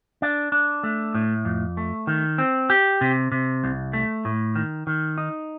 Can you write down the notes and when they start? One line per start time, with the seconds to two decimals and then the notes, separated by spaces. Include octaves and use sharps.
0.22 D4
0.52 D4
0.83 A3
1.14 A2
1.45 F2
1.77 A3
2.07 D#3
2.38 C4
2.70 G4
3.01 C3
3.32 C3
3.64 C2
3.93 A3
4.25 A2
4.55 D#3
4.87 D#3
5.18 D#4